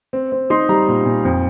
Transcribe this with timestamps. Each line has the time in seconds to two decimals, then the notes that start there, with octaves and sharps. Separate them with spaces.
0.13 C4
0.32 C4
0.50 D#4 C6
0.69 G3 A#5
0.88 A#2
1.05 A#2
1.25 F2